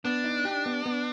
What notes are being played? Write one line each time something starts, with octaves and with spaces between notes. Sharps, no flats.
B3 D4
D#4
G4
B3
B3